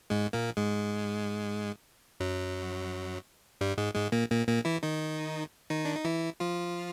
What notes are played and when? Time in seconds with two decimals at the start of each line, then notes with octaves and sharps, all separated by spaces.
0.10 G#2 G#3
0.33 A#2 A#3
0.57 G#2 G#3
2.20 F#2 F#3
3.61 G2 G3
3.78 G#2 G#3
3.95 G#2 G#3
4.12 A#2 A#3
4.31 A#2 A#3
4.48 A#2 A#3
4.65 E3 E4
4.83 D#3 D#4
5.70 D#3 D#4
5.85 D4
5.96 D#4
6.05 E3 E4
6.40 F3 F4